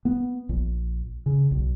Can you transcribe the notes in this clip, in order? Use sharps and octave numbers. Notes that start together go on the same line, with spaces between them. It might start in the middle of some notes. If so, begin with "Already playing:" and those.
B3
A#1
C#3
B1